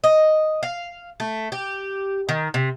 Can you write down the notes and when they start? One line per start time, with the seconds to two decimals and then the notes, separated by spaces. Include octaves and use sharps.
0.04 D#5
0.63 F5
1.20 A3
1.52 G4
2.29 D#3
2.54 C3